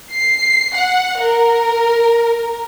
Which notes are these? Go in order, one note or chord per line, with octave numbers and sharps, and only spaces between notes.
C7
F#5
A#4